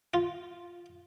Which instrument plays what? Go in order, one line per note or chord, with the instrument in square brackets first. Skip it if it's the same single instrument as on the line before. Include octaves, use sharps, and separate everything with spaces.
[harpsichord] F4